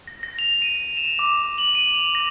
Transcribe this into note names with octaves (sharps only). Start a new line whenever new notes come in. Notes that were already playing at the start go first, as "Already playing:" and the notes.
A#6
A#6
F7
D#7
E7
D6
F#7
D#7
F7
A#6